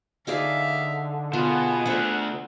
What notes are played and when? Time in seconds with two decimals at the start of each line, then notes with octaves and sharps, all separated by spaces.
0.27 D3 D#4 G#4 D5 E5 F5
1.33 B2 B3 F4 G#4
1.86 D3 A3 C5 E5 F#5